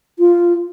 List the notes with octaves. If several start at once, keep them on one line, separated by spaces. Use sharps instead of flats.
F4